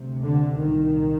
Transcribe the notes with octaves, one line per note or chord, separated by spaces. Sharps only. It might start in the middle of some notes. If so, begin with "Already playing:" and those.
Already playing: D2 C3
D3
C2 A#2 D#3